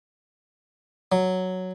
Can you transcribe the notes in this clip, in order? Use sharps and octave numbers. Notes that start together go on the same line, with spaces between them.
F#3